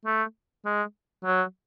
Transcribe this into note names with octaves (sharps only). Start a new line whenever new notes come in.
A3
G#3
F#3